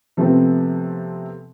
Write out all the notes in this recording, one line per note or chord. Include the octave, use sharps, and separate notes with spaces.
C3 F3 A3 B3 C4